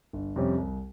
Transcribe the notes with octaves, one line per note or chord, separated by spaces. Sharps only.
G1
F2 C3 G3 C#4
C2